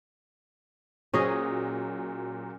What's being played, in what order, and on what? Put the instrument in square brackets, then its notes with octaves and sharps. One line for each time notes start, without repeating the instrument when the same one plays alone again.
[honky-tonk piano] A#2 F#3 [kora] C#4 G#4 D#5